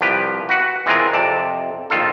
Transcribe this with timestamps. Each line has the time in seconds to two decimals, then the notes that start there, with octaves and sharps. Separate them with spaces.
0.01 C2 F3 G4 B4
0.49 F#4 B4 F#5
0.86 E3 G#3 C4 F4 G#4 A#4
1.13 F2 C3 D5 A5
1.90 A#1 D#3 F4 A4